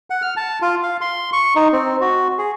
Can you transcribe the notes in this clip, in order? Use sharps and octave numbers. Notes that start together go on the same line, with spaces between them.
F#5
F6
A5
F4
F5
C6
C#6
D#4
C4
F#4
G#4